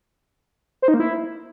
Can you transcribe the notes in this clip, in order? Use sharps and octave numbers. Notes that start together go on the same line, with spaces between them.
C5
D#4
A#3
E4